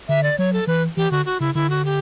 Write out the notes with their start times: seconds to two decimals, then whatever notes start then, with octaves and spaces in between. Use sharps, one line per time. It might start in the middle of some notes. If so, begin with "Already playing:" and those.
0.09 D3 E5
0.23 D5
0.38 F#3 C#5
0.53 A4
0.67 E3 B4
0.97 E3 G4
1.11 D3 F#4
1.25 F#4
1.40 C#3 E4
1.55 D3 E4
1.70 F#4
1.85 G4